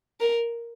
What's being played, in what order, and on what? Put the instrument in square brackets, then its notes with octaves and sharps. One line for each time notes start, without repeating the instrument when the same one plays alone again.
[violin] A#4